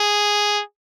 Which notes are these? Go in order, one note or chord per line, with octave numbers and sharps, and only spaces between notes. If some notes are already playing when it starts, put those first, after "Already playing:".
Already playing: G#4